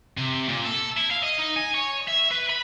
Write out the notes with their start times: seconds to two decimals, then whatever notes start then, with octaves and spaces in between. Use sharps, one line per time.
0.17 C3
0.49 A#2
0.64 A4
0.97 E4
1.11 F5
1.23 D#5
1.38 D#4
1.56 G#5
1.74 C#5
2.08 E5
2.31 B4
2.50 B5